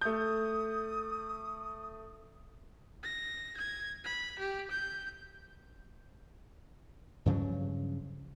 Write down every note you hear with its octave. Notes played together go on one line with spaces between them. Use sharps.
A3 D#6 G6
A#6
G#6
B5
G4
G6
G2 C#3 F3 F#3